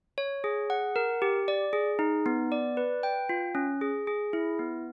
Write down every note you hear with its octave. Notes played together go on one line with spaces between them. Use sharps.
C#5
G#4
F#5
A#4
G4
D5
G#4
D#4
B3
D5
B4
G5
F4
C#4
G#4
G#4
E4
B3